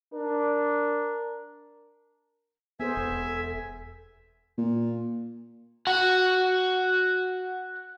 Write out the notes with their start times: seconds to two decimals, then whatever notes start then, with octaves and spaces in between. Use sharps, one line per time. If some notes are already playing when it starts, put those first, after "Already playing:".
0.14 D4 A#4
2.80 B3 G#4 A4 C5 E5 G#5
2.97 E1
4.58 A#2
5.87 F#4 F#5